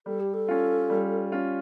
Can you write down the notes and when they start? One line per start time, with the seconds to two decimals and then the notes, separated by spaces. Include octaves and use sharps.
0.06 G3 A4
0.20 G4
0.33 A4
0.48 C#4 F4
0.90 G3
1.32 C#4 F4